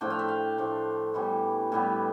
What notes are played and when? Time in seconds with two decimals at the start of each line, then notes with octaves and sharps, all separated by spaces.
0.01 A2 F3 A3 D4 G5
0.10 F5
0.19 E5
0.28 F5
0.58 A2 F3 A3 D4
1.14 A2 E3 G3 B3
1.72 A2 E3 G3 B3